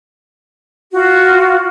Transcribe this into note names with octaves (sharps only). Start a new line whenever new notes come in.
F4 F#4